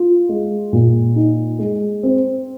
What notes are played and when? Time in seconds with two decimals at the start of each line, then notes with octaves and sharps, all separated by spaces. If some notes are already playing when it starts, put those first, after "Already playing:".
Already playing: F4
0.29 G#3
0.73 A#2
1.16 D#4
1.59 G#3
2.03 C4